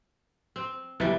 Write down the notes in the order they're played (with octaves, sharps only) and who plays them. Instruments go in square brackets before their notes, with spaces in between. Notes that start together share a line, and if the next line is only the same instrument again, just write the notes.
[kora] C4
[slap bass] F#1 B1 [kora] E3 G3